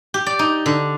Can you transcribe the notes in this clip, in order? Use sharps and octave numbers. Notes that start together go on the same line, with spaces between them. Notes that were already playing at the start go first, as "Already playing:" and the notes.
G4
D5
D#4
D3